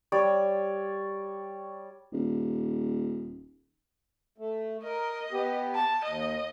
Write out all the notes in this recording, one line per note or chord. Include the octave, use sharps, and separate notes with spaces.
G3 C#5 D5
D#1
A3
A#4 D#5
B3 G4
A5
D#2 D#5